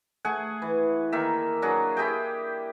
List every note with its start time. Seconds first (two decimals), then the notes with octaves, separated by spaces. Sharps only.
0.25 A3 G#4 F#5 G#5
0.62 E3
1.12 D#3 A#3 E5
1.62 F#3 D4 F#4 G#4
1.97 E4 G4 G#4 G5